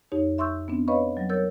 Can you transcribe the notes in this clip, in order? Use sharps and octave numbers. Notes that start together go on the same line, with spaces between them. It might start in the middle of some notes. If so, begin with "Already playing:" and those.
F2 D#4 G4 C#5
E5 C6 C#6 E6 G6
B3 C4 D4
B4 C#5 D#5 F5 B5 C#6
F#3 G3
A#4 C#5 E6 G6 A6